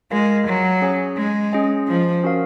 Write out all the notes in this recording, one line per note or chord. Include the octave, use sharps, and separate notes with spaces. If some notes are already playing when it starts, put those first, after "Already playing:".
G#3 F4 A#4 F5 G#5
F#3
C#4 G#4 C#5 G#5
G#3
C#4 G#4 D#5 G#5
F3
C#4 F#4 A#4 F5